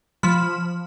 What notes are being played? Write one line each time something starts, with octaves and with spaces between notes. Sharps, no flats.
F3 B5